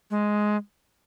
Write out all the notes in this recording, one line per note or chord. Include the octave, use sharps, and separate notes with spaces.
G#3